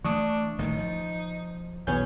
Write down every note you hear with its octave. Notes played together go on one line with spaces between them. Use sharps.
E3 A3 D4 C#6 D#6
A1 D#3 D#4
F3
B1 E2 B3 C#4 G6